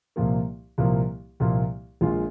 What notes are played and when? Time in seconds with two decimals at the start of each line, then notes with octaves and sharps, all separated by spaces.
0.16 C2 A#2 F3 A#3
0.78 C2 A#2 F3 A#3
1.40 C2 A#2 F3 A#3
2.01 A#1 A#2 G#3 F4